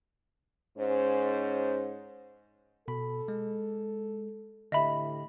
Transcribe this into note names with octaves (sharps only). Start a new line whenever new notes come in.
G#2 C#4 C5
B2 A4 B5
G#3
A2 D3 G4 D#5 E5 B5